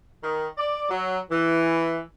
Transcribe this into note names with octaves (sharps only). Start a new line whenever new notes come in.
D#3
D5
F#3
E3